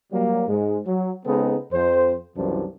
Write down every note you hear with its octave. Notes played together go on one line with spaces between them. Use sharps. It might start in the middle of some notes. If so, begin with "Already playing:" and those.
F#3 G3 A#3
G#2 G#3
F#3
C#3 G#3 B3 C4 D#4 A4
F2 C5
C2 F#2 E3 F3 D4 C5